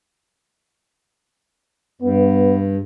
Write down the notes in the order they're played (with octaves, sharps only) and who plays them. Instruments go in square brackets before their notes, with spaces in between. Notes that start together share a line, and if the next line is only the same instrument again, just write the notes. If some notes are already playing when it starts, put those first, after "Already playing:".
[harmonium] G2 [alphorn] B3